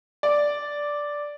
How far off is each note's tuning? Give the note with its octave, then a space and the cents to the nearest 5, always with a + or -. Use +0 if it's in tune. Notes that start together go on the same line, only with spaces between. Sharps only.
D5 -5